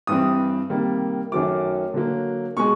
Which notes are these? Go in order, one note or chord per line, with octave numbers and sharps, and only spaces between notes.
G2 E3 G3 C4 D#6
C3 D#3 G3 A#3
F#2 D#3 F#3 A3 D6
D3 F#3 A#3
B2 G#3 C#6